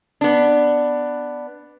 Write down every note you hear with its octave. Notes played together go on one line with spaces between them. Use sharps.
B3 D4